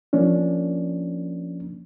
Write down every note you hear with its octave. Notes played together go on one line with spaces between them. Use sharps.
F3 A#3 C#4 D4